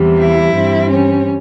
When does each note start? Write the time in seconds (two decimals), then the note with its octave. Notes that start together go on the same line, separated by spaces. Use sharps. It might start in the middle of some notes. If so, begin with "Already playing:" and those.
Already playing: E2 C3 E3 G3
0.19 E4
0.54 G2 E3 G3 C4
0.90 C#4